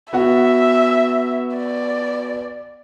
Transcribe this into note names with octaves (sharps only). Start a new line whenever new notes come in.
B3 F#4 E5 F#5
D5